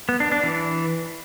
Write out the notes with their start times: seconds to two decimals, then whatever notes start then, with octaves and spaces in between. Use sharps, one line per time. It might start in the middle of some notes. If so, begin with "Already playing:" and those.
0.09 B3
0.20 D4
0.32 D4
0.43 E3